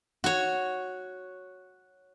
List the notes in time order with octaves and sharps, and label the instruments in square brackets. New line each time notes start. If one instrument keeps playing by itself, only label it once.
[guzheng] F#4 C#5